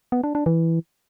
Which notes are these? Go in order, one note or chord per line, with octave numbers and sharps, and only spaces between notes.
B3
D4
D4
E3